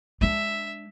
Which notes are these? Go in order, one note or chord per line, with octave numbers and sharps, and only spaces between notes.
G#3 D4 E5